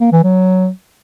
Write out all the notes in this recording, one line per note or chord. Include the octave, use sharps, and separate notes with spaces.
A#3
E3
F#3